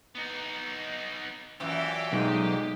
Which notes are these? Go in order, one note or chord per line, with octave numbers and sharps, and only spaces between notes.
B3 D#4
F#2 A#2 E3 G4
B1 G#3 D#4